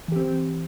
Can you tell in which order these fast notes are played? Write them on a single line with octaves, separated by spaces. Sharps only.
E3 G4 C4